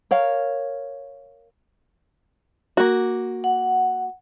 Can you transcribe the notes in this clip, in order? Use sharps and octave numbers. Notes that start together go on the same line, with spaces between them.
A#4 C#5 F5
A#3 F#4
F#5